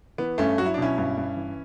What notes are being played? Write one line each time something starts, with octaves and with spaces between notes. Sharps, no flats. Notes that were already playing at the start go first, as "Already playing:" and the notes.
E3 B3
G2 A3 C#4
F#3 F#4
E4
D4
B2 C#4 E4
G2
G2
E3